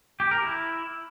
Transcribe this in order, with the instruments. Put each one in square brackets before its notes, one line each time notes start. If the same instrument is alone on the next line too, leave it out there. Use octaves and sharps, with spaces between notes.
[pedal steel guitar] G4
A#4
E4